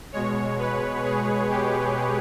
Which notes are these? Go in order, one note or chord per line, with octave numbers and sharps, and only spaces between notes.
B2 G#3 C#5
B4
G#4
G4